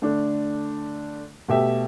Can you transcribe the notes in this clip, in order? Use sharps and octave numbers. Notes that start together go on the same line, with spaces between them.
D3 A3 D4
B2 A3 G4 E5